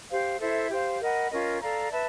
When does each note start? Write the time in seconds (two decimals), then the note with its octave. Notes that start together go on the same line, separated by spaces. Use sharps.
0.11 G4 C5 F5
0.40 E4 A4 C5 E5
0.70 G4 C5 F5
1.01 A#4 D#5 F#5 B5
1.31 C#4 F4 A#4 D#5
1.61 A4 D5 F5 A#5
1.91 B4 E5 A5